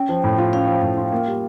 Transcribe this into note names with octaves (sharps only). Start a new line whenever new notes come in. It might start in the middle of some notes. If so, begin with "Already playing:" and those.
Already playing: C#4 G5
F3
A2
F4
C#4 F5
F3
A2
F4
A#3
G3